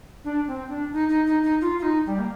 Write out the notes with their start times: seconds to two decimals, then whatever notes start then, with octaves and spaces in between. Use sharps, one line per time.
0.24 D4
0.47 C4
0.69 D4
0.92 D#4
1.09 D#4
1.27 D#4
1.43 D#4
1.61 F4
1.79 F4
1.83 D#4
2.06 G3
2.19 A#3